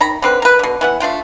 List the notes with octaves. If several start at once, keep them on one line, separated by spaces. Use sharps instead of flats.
D#3 A#5 B5
D3 C4 B4
A#4 B4
B2 D3
E3 B3 F#5
A3 D4 F4 G5